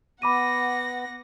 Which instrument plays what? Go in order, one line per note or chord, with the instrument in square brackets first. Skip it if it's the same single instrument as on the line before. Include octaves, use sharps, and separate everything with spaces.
[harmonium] B3 [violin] F#5 A#6 [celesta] B5 D6 D#7